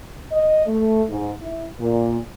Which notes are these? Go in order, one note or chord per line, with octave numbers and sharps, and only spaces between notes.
D#5
A3
G#2
E4
A#2